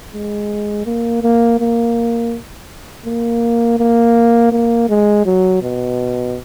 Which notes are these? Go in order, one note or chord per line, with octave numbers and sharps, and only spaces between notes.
G#3
A#3
A#3
A#3
A#3
A#3
A#3
G#3
F#3
B2